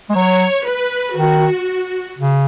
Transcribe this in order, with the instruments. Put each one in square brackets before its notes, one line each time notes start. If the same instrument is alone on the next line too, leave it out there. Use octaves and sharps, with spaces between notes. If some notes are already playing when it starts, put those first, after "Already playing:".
[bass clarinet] G#3
[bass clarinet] F#3 [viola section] C#5
[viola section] B4
[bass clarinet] D#3 [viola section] F#4
[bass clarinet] C#3